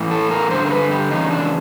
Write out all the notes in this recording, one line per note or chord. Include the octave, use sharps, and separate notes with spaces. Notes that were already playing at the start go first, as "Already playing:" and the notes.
Already playing: A2 E3
A4
A#4
G2 D3 C5
A#4
B4
G4
E2 C#3 D#4
D4